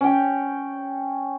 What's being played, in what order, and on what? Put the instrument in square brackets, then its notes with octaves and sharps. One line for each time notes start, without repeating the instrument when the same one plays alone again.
[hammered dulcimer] C#4 G5